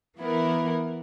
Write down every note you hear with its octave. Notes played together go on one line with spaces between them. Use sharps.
E3 B3 E4 A#4